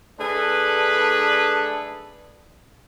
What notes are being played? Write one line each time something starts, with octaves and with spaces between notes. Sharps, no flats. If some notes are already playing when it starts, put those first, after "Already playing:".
A3 D4 G#4 A4 B4